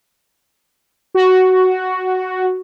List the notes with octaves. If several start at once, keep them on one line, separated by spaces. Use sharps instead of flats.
F#4